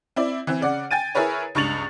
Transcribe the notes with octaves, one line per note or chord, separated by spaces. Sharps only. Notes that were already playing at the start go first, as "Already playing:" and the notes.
C4 E4 D5
E3 C4
C#3 D5 F#5
G5 G#5 A6 D#7
E4 G#4 A#4 B4 C#5
C#2 G2 C#6 A6 F7 F#7